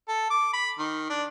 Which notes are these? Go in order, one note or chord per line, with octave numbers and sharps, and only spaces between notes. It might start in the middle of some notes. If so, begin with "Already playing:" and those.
A4
D6
B5
D#3
D4